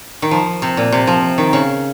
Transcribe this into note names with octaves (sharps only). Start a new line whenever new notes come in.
D#3
F3
C3
A#2
C3
F3
D#3
C#3